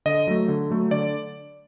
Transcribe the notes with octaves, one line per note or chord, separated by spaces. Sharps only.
D3 D#5
F#3 A3
D3
F#3 A3
D3 D5